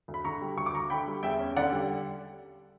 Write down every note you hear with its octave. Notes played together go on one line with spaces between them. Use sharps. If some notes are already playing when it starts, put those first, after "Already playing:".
D2
B5
D3 A#5 C#6
G3
D2 C#6
D6
D2 A#5 C#6
D3 G5 B5
G3
E2 E5 G5
C#4
D3 D5 F#5
G3